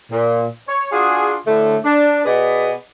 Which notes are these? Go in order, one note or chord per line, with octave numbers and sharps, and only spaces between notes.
A#2
C#5
D4 F4 F#4 G#4
A2 D3 A3
D4
B2 B3 G#4 B4 D5 D#5